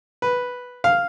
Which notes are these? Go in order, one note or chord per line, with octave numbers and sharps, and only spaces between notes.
B4
F5